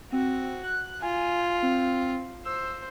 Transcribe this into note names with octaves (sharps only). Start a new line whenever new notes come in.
C4 F#4
F#6
F4 G#5
C4
C5 E6